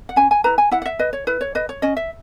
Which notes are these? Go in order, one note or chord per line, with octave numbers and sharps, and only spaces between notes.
F#5
C#4 G#5
G#5
E4 B4 A#5
G#5
E4 F#5
F#5
E5
B4 D#5
C#5
E4 B4
C#5
B4 D#5
C#5
C#4 D#5
E5